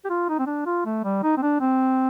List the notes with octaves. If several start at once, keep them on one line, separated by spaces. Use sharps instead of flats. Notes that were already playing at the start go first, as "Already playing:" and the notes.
G4
F4
D#4
C4
D4
F4
A3
G3
D#4
C4
D4
C4